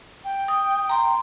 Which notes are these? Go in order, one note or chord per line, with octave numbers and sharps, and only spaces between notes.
G5
D#6
A#5 C6